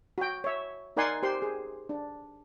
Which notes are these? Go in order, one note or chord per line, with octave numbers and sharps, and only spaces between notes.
F#4 G5
C#5 E5
D#4 A#4 D5 F#5 G#5 C6
G4 C5 C6
G#4
D4